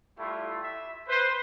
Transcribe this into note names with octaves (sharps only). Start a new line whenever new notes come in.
G3 A3 E4 F4
E5
B4 C5